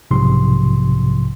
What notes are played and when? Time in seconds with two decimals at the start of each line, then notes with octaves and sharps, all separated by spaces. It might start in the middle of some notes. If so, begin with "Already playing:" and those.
0.11 B1 G#2 C3 F3 C6